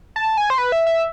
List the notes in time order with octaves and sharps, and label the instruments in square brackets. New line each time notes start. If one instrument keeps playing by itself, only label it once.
[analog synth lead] A5
G#5
C5
B4
E5
E5